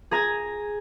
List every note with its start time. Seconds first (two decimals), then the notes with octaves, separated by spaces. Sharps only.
0.11 G#4 A#5 G#6